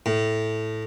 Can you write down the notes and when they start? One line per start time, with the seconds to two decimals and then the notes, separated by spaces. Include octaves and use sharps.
0.06 A2